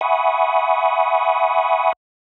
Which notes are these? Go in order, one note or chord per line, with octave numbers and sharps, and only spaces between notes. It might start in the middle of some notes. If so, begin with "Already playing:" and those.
E5 F#5 G#5 B5 C#6 D#6